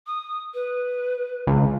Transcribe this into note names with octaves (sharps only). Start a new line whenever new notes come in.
D#6
B4
C#2